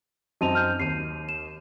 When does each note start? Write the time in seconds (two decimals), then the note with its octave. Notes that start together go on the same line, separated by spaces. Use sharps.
0.41 F#2 C4 D#4 A5 D#7 F7
0.55 F6 G6
0.80 D#2 C7 D#7
1.29 E7